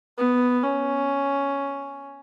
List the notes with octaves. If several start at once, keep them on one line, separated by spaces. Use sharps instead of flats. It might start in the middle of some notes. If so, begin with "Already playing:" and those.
B3
C#4